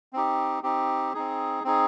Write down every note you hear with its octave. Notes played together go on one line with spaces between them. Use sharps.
C4 D#4 G4
C4 D#4 G4
C4 D#4 G#4
C4 D#4 G#4